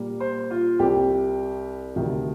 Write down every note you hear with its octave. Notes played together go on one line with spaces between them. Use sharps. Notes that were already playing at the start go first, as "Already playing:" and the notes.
Already playing: A#2 G3 A#3
C5
F4
C2 C3 G3 C4 G4
D2 C3 D#3 G3